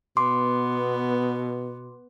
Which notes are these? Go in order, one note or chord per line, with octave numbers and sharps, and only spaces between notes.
B2 B3 C6 D6